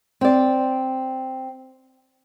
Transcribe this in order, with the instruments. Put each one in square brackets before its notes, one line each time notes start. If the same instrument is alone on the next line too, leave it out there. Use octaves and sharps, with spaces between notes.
[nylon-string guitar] C4 D5